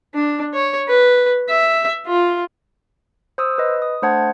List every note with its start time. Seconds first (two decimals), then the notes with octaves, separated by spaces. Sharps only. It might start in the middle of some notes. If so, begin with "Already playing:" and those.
0.14 D4
0.54 C#5
0.88 B4
1.49 E5
2.06 F4
3.38 C5 D#6 E6
3.58 B4 D#5
3.82 D#6
4.02 A3 D4 C5 F#5 A5 G#6